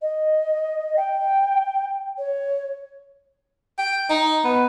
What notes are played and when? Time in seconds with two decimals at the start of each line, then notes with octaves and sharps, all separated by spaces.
0.01 D#5
0.96 G5
2.17 C#5
3.78 G5
4.10 D#4
4.45 B3